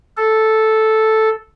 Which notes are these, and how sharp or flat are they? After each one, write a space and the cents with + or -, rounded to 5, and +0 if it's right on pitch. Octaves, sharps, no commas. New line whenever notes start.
A4 -5